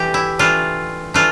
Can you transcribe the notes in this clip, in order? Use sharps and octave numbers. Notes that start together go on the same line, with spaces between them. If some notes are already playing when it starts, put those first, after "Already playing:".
Already playing: E3 A3 D4 G4
E4
E3 A3 D4 F4
E3 A3 D4 F4